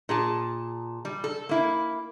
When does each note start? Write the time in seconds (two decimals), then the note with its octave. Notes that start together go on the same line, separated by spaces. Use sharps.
0.09 A#2 G#4 A5
1.05 G3
1.24 A4
1.49 A#3 E4